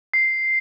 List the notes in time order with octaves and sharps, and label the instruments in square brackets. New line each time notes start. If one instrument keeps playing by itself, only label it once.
[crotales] C7